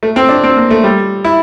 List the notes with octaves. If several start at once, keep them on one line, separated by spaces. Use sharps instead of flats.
A3
C4
D4
C4
A#3
A3
G3
E4